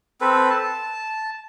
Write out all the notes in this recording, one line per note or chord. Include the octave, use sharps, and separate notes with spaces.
C4 A4 B4
A5